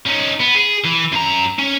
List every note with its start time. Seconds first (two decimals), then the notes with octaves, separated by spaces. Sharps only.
0.07 C#4 D#4
0.41 B3
0.55 G#4
0.85 E3
1.13 F#2 A#5
1.59 C#4